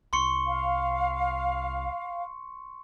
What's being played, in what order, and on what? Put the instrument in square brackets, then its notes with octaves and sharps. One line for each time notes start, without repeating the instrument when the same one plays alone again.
[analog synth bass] C2 [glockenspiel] C6 C#6 C#7
[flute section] F5